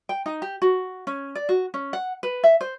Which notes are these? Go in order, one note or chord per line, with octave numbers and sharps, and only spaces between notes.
G5
D#4
G4
F#4
C#4
D5
F#4
C#4
F#5
B4
E5
C5